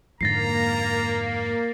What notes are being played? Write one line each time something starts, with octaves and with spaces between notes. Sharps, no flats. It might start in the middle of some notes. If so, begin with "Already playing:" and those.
F2 G#2 D3 A#3 A#5 A6 A#6 C7